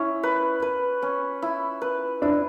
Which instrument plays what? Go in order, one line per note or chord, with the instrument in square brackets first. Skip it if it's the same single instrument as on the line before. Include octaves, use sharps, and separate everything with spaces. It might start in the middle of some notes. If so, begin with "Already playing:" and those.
Already playing: [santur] C#4 [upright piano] E4
[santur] B4
B4
C#4
E4
B4
[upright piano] D4 [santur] E4